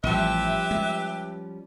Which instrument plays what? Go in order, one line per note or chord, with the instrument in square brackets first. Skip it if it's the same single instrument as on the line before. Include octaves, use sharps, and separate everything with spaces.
[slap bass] A1 [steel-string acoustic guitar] F3 G3 C#4 [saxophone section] G4 B4 E5
[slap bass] G#3